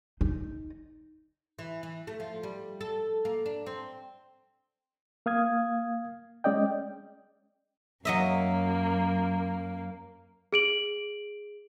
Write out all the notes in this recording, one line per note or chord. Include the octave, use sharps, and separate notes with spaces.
D#4
E3
E3
A3
F3
G3
A4
A#3
D4
C4
A#3 F5 D#6 G#6
G#3 C#4 D5 D#5 G5
F#2 F#3 A#3 D#5 E5
G#4 D7 F#7